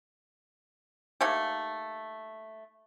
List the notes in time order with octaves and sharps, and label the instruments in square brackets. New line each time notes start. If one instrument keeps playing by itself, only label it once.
[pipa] A3 A#3 D#4 G4